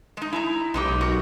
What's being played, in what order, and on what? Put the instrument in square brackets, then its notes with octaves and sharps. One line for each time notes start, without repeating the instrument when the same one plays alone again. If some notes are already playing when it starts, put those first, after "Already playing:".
[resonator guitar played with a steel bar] G#3 D#4
E4 A5 A#5
[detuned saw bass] B1 [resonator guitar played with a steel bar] G#3 D#4 G4
[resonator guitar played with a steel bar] F#4 A#4